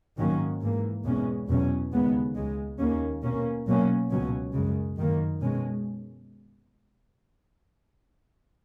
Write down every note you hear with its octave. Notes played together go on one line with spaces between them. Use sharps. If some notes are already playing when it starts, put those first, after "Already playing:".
G#2 D#3 F#3 A#3 C#4
G#2 E3 A#3
E2 B2 G#3 C#4
E2 B2 F#3 C#4
D#2 C#3 G#3 B3
C#2 C#3 G#3
D#2 D#3 A#3 C#4
B2 A#3 C#4
B2 F#3 A#3 C#4
C#2 B2 F#3 C#4
F#2 C#3 G#3
F#2 D#3 A#3
B2 G#3 C#4